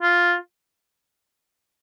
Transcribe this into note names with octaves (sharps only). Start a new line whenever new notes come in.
F4